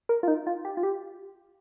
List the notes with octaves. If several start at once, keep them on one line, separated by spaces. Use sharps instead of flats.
A#4
F4
D#4
F4
G4
F4
G4